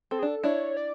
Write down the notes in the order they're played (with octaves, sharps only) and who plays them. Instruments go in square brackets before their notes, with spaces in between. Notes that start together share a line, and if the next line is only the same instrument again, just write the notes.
[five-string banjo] C4 [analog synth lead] A4
[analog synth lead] G#4
[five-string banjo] D4 [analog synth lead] A4
[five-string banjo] D4 E4 [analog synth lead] C#5
[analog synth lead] D5